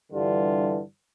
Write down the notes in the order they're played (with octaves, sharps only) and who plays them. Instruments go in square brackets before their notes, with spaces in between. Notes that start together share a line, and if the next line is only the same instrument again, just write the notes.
[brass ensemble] G2 D3 E3 G3 F4